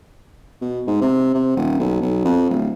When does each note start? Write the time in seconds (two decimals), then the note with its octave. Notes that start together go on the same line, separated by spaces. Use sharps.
0.61 B2
0.87 G#2
1.01 C3
1.34 C3
1.57 D#1
1.80 B1
2.01 B1
2.25 F2
2.50 D1